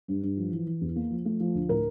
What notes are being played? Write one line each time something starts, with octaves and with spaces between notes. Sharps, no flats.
G2
G2
F3
E3
E3
E2
A#3
F3
A3
F3
D2
A2 A#4